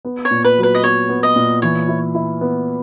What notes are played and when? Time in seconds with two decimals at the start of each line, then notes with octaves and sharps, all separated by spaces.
0.05 B3
0.25 C#5
0.31 A#2
0.44 B4
0.57 F#3
0.63 B4
0.75 D#5
0.84 B3 C#5
1.09 B3
1.23 D#5
1.36 A#2
1.62 E3 C#5
1.88 E4
2.15 E4
2.41 B3